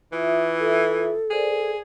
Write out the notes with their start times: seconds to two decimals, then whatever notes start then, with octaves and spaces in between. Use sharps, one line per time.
0.12 E3 F4 E5 D#6
0.60 A4
1.31 G#4 A#4 C5 D5